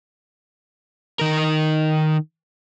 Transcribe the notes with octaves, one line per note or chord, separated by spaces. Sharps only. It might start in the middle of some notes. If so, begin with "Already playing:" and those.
D#3 A#4